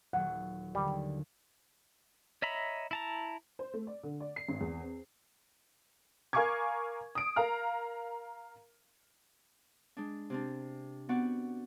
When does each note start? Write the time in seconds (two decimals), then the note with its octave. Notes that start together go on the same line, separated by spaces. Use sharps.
0.13 D#1 F#3 F#5
0.75 D#2 D3 G3
2.42 C#5 D#5 E5 A#5 B5
2.91 E4 A5 A#5
3.59 C5
3.74 A3
3.87 D5
4.03 D3
4.20 D5
4.36 C7
4.49 G#1
4.61 E2
4.81 C4
6.33 A#4 F5 G#5 C#6 D6 G#6
7.15 D#6 D7
7.36 A#4 F5 A#5 F6
9.97 G#3 D4
10.30 C3 C4 D4
11.09 B3 C4 F#4 D5 F#5